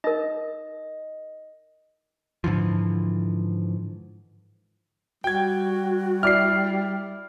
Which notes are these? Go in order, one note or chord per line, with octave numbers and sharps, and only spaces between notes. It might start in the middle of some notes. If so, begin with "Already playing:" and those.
D#4 A#4 D#5
G#2 D3 E3 F3
G3 F#4 G5 G#6
E4 D5 F6 C7